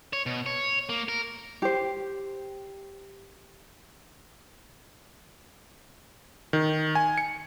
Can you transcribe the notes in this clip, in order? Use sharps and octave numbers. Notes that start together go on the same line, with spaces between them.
C#5
B2
C#5
A#3
A#4
G4 C5
D#3
G#5
C#7